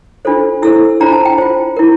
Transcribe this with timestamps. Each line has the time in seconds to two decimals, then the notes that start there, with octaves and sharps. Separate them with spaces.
0.25 D4 F4 A4 C5
0.62 E4 A4 C5 E6
1.00 D4 F4 C5 A#5
1.13 A5
1.25 G5
1.38 F4 C5
1.77 E4 A#4